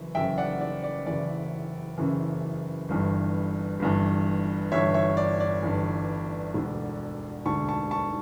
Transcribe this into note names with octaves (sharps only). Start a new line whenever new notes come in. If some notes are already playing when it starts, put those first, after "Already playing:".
Already playing: F#1 F#2 E3
F#1 F#2 C#3 E3 E5 G5
D5 F#5
D5
D5
F#1 F#2 C#3 E3 D5
F#1 F#2 C#3 E3
G1 G2 E3
G1 G2 E3
G1 G2 E3 C#5 E5
C#5 E5
D5
D5
G1 G2 E3
E1 D2 D3
E1 D2 D3 A5 C#6
A5 C#6
A5 C#6